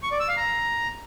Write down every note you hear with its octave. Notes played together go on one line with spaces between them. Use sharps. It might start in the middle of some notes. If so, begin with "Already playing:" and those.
C#6
D5
E6
F5
A#5